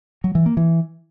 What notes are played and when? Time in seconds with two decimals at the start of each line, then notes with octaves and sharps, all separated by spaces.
0.24 F#3
0.35 E3
0.46 A#3
0.57 E3